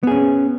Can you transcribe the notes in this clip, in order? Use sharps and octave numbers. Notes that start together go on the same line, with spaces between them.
B3 C#4 G#4